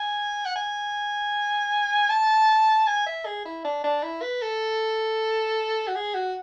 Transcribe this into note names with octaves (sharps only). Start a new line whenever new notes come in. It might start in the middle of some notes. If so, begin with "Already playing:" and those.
Already playing: G#5
F#5
G#5
A5
G#5
E5
G#4
E4
D4
D4
E4
B4
A4
F#4
G#4
F#4